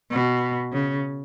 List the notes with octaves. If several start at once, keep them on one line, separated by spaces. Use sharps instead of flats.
B2
C#3